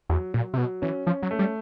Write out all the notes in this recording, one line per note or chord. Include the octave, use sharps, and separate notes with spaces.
E2 F#3
A#2 F#3
C3
B2 F#3
E3 C#4
F3 C#4
F#3
A3
G3